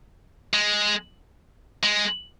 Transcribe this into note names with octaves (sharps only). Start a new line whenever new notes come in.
G#3
G#3